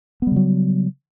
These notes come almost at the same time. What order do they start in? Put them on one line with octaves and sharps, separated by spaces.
B3 G3 C#3 F#3